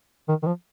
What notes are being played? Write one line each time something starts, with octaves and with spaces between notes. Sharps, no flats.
D#3
D#3
F3